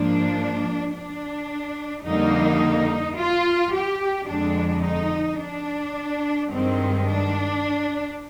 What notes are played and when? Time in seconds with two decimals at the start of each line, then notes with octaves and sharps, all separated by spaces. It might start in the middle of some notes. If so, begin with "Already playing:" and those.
Already playing: G#2 F3 A#3 D4
0.93 D4
2.05 F2 D3 G3 A#3 D#4
3.17 F4
3.73 G4
4.28 F2 D3 G#3 D4
4.84 D#4
5.40 D4
6.51 G2 D#3 G#3 C4
7.07 D4